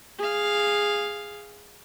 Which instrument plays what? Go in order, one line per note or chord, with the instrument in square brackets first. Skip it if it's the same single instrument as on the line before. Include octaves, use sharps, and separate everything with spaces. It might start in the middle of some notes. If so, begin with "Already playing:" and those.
[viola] G#4 F5